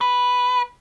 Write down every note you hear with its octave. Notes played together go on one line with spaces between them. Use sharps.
B4